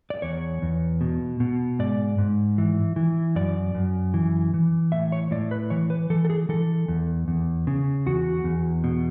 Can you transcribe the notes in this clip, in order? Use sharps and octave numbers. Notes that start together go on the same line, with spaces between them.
D5
E2 C#5
E2
B2
B2
G#2 D5
G#2
E3
E3
F#2 D5
F#2
E3
E3
A2 E5
C#5
A2 D5
B4
E3 C#5
B4
E3 A4
A4
G#4
E3 A4
E2
E2
C#3
E2 F#4
E2
B2